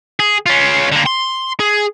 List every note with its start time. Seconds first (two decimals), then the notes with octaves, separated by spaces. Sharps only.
0.20 G#4
0.46 C#4 F4
0.92 D3 A#3
1.06 C6
1.60 G#4